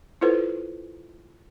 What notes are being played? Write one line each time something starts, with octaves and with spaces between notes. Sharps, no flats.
E4 F4 A4 B4 C5